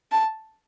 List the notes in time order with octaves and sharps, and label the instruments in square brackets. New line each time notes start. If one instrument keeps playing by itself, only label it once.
[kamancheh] A5